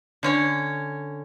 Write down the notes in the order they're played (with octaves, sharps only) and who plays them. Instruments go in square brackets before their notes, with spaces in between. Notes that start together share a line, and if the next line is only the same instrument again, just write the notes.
[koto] D3 C#4 C#5